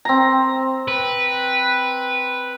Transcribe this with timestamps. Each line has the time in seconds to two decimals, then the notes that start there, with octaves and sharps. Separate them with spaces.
0.05 C4 A#5
0.88 B4